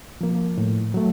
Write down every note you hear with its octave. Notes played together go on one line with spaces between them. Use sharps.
F3 A#3
A2
F#3 A3